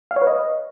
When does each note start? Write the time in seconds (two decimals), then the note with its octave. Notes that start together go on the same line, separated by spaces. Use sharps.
0.11 F5
0.16 C#5
0.22 B4
0.27 D#5